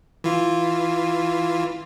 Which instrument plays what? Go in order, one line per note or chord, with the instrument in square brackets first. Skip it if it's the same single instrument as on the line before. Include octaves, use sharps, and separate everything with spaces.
[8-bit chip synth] E3 F4